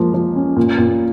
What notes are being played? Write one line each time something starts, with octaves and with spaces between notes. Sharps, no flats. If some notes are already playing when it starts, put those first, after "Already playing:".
Already playing: F3 G#3 A#3
F3
C#4
A#2
A#2